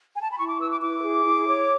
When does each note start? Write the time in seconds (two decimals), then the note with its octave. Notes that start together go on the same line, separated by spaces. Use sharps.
0.17 G#5
0.23 A5
0.31 B5
0.38 E4 C#6
0.49 D6
0.60 B4 E6
0.70 D6
0.82 E4 D6
1.03 G#4
1.25 E4
1.47 C#5